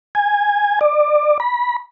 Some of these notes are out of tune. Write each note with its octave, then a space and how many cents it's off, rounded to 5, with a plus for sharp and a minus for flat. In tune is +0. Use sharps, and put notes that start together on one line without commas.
G#5 -10
D5 +25
B5 -25